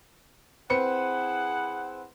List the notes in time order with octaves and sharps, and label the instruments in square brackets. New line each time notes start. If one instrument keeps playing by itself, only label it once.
[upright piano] C4 B4 C#7 [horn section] E4 G#4 F#5